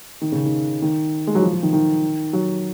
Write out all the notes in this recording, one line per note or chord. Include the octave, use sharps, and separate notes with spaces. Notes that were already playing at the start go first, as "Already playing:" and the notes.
D#3
C#3
D#3
D#3
G#3
F#3
F3
F3
D#3
D#3
F#3